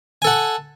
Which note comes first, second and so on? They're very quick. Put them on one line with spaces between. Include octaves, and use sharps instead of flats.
G#5 A4 F#5